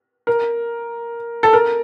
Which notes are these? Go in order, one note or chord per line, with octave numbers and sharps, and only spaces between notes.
A#4
A4
A#4